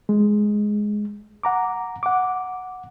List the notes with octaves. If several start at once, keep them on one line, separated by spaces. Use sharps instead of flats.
G#3
F#5 A#5 D6
F#5 D6